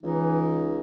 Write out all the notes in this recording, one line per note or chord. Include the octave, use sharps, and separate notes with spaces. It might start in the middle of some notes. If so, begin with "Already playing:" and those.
C#2 E3 D#4